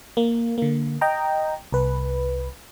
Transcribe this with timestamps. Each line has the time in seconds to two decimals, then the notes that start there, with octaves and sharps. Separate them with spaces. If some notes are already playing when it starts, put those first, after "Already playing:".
0.17 A#3
0.58 D3 A#3
1.01 D#5 G5 A#5
1.72 C2 B4